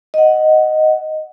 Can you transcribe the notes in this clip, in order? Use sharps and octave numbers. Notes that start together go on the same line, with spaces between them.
D#5 F#5